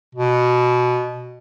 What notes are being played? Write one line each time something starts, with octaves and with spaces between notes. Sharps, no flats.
B2